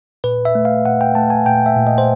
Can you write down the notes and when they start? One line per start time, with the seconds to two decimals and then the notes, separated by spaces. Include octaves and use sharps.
0.24 A#2 B4
0.45 E5
0.55 A3
0.65 F5
0.85 A#2 F#5
1.01 G5
1.15 A3 A5
1.30 G#5
1.46 A#2 G5
1.66 E5
1.77 A#2
1.87 D#5
1.98 C5